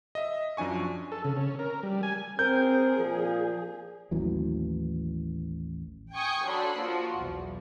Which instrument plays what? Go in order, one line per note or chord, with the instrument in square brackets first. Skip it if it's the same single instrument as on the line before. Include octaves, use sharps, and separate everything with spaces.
[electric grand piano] D#5 E5
F#2 F3 D4 G#5 C#6
[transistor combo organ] A4
C#3
C#4
A#4
G3
G#5
[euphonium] C4 [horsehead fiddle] G#4 [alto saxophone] A#4 [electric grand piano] G6
[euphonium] A#2 [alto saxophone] F3
[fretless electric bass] A1 D#2 E3 F#3
[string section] G5 G#5 C#6 D#6 G6
F#3 D4 A4 B5 C6
F3 A#3 F4 F#4
B1 E2